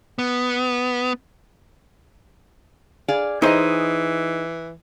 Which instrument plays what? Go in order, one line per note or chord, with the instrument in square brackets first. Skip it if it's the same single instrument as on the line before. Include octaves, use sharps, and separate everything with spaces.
[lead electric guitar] B3
[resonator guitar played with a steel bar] G#4 D5 F5
[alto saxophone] E3 [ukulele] D#4 C5 [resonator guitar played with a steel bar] G#4 C#5 D#5